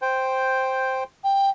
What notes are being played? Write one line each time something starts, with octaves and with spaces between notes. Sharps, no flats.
C5 G5
G5